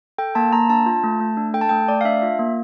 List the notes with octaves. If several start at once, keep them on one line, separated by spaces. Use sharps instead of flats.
A4 G5
A#3 A5
A#3 A#5
D4 A5
F4
A3
A3
D4
A4 G5
A5
A3 G5
A3 D5
F5
D4 E5
F4
A#3